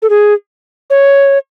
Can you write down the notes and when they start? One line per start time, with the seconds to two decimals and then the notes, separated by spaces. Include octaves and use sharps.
0.02 A4
0.10 G#4
0.90 C#5